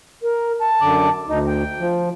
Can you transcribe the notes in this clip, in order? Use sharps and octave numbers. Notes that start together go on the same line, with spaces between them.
A#4
A5
F#2 D3 D6
D2 D#4
G5
F3